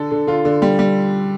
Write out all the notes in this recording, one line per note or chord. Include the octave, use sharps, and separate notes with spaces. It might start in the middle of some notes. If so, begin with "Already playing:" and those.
Already playing: D3 A4
D3
D3 F4
D3
G3
G3